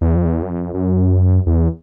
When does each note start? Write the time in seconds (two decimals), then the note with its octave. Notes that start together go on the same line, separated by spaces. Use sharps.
0.01 E2
0.16 F2
0.25 E2
0.43 F#2
0.49 F2
0.74 F#2
1.46 E2